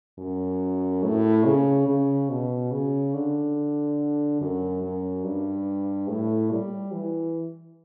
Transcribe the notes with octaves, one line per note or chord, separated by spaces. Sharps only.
F#2
A2
C#3
C#3
B2
C#3
D3
F#2
F#2
G2
A2
G3
E3